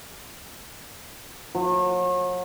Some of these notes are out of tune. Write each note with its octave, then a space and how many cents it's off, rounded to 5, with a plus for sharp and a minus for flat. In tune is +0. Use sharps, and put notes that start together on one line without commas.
F#3 -40